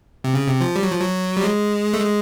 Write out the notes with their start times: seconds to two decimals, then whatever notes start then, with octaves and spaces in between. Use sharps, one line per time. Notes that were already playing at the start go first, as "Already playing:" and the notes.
0.24 C3
0.34 C#3
0.48 C3
0.61 F3
0.76 G3
0.83 F#3
0.92 F3
1.01 F#3
1.37 G3
1.44 G#3
1.93 A3
1.99 G#3